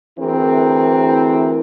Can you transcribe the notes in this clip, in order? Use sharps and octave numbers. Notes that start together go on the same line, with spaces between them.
D2 E3 C4 E4 G#4 A#4